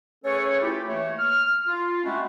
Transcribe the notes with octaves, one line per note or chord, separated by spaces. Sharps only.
A3 C#4 G#4 A4 B4 C#5
A3 E4 F4 G4
E3 A3 A#3 C#5
F6
F4
G#3 A3 C4 C#4 E4 F#4